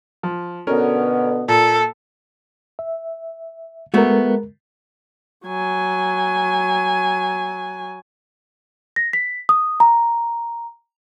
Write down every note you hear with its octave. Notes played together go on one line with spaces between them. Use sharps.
F3
B2 D3 B3 C#4 A#4
A#2 A4
E5
G#3 A3 B3 F#4 A#4
F#3 G#5
A#6
B6
D#6
A#5